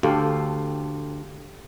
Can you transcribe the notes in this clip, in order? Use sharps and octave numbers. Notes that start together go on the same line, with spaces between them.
D2 G4 A4 F5